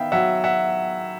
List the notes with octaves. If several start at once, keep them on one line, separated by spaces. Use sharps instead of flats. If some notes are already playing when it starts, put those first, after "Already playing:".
Already playing: D#3 B3 E5 F5 G5
F#3 E5 F#5
E5 F#5